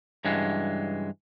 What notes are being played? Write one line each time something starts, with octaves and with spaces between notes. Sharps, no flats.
G2 C#3 E3 F#3 G#3